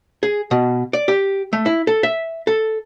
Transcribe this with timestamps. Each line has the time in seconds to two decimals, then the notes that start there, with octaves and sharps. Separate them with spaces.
0.23 G#4
0.51 B2
0.93 D5
1.08 G4
1.53 A3
1.66 E4
1.87 A4
2.03 E5
2.47 A4